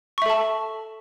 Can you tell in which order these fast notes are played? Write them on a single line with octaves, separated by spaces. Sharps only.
C#6 E5 A4 A5